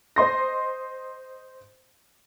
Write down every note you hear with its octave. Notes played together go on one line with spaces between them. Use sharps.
C5 D#5 C6 A#6